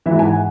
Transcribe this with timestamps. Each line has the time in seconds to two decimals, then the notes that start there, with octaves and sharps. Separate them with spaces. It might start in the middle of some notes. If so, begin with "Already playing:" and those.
0.06 G#2 E3 E5
0.19 G#5
0.25 F#5